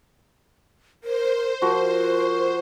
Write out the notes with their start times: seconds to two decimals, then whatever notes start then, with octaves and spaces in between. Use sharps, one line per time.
1.04 A#4 C5
1.62 F3 F#4 A#4